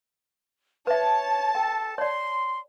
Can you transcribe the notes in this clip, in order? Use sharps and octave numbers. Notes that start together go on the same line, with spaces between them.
B4 C#5 E5 A5
A4 G5
C#5 D5 C6